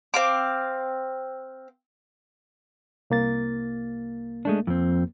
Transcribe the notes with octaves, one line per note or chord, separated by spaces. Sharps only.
C4 F5 D6
C2 A#3 A6
G#3 A3 D4
F2 C4